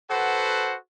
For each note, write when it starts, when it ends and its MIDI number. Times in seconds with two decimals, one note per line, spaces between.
0.11 0.77 66
0.11 0.77 69
0.11 0.77 71
0.11 0.77 72
0.11 0.77 78